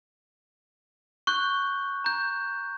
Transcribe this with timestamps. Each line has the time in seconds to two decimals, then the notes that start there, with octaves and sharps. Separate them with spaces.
1.27 C#6 F#6 G6
2.04 A#5 G6